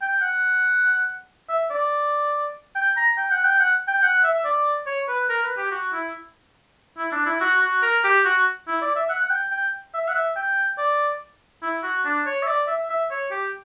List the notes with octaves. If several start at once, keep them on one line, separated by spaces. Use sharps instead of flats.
G5
F#5
E5
D5
G5
A#5
G5
F#5
G5
F#5
G5
F#5
E5
D5
C#5
B4
A#4
B4
G4
F#4
E4
E4
D4
E4
F#4
F#4
A#4
G4
F#4
E4
D5
E5
F#5
F#5
G5
G5
E5
F#5
E5
G5
D5
E4
F#4
D4
C#5
E5
D5
E5
E5
C#5
G4